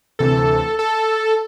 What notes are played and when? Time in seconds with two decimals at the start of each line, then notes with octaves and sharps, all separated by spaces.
0.19 D2 C3 E3 A4
0.79 A4